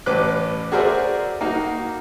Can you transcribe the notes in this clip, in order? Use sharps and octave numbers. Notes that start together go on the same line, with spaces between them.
A1 C#4 B4 D6 F#6
F#4 G#4 A#4 C5 D5 E5
A#3 D#4 F#4